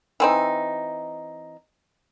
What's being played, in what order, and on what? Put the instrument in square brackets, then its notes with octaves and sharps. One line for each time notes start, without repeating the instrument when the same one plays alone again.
[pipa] E3 C4 D#4